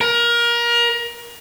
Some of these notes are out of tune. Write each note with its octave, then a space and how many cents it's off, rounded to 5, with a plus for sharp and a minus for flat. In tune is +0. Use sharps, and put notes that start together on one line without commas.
A#4 +25